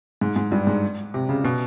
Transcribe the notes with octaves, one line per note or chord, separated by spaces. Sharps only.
G#2
G#2
G2
G#2
C3
C#3
B2